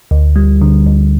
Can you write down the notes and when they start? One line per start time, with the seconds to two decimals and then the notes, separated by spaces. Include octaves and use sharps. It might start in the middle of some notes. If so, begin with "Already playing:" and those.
0.11 D2
0.36 G3
0.61 D3
0.86 D2